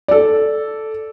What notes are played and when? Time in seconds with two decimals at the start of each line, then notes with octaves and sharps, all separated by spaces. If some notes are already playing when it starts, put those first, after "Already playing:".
0.08 A4 D5